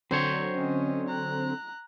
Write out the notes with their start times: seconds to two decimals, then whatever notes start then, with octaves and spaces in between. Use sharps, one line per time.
0.11 D3 F#3 C4 C5 C#5
0.55 C#4 D#5
1.08 A#5 F#6